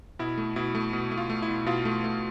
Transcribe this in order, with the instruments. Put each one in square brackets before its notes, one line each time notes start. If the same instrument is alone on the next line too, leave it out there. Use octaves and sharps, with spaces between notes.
[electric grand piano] B2 E4
A3
B2 E4
A3
B2
A3
F4
A3
E4
B2
B2 F4
A3
A3